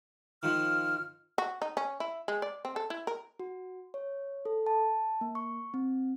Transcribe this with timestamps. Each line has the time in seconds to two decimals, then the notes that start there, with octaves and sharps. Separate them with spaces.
0.43 D#3 F3 F6
1.38 F#4
1.62 D#4
1.77 C#4
2.00 E4
2.28 G#3
2.42 D5
2.65 C4
2.76 A4
2.90 E4
3.07 A#4
3.40 F#4
3.94 C#5
4.45 A4
4.67 A5
5.21 A#3
5.35 C#6
5.74 C4